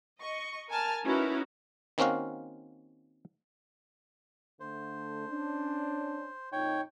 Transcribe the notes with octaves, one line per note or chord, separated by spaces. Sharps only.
D#5 C#6
A#4 G#5 A5 F6
C#4 D#4 E4 F#4 A#4 B4
D#3 A#3 C4 C#4 F#4 F5
D3 A3 C5
C#4 D4
F2 A#2 D#4 C#5 G5